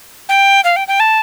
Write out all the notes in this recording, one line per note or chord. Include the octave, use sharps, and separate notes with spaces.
G5
F5
G5
G5
A5